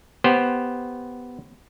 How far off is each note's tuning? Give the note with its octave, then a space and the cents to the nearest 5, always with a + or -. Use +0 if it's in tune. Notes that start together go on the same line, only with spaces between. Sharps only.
B3 +0 G4 +0 C5 +0